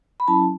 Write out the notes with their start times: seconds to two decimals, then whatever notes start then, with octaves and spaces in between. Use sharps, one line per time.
0.20 B5
0.28 F#3 C#4 E4 A5